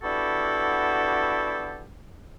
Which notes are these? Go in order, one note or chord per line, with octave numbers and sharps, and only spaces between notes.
B3 D4 E4 F#4 G4 A4